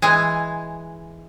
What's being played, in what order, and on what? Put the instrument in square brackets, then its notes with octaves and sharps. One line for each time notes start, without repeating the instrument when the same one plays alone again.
[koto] E3 G#3